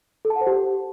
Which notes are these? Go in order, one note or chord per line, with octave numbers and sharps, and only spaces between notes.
A4
A5
F#5
C5
G4